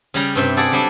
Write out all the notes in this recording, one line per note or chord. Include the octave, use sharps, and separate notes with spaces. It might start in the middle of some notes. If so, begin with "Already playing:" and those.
C#3 G3 A#5
G2 C3 E5
F#4 G#4 A4 D5
F#3 G3 D4